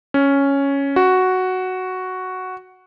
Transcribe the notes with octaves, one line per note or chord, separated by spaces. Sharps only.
C#4
F#4